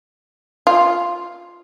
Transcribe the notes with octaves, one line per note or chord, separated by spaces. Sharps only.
F4